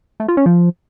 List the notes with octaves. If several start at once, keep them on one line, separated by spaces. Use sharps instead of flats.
A3
F4
C#4
F3